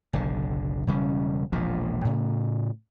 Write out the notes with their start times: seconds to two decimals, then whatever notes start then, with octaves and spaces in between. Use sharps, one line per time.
0.13 F#1 B1 D3
0.87 E1 C#3 G3 C#4
1.52 E1 A#1 A#2 F3
2.05 A2 C#3